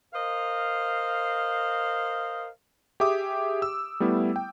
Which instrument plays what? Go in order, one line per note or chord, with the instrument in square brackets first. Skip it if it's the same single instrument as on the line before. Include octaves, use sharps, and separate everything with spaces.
[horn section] A#4 C5 D#5 F5
[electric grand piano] G4 G#4 E5 D6 D#6
E6
G3 A3 B3 E4
G5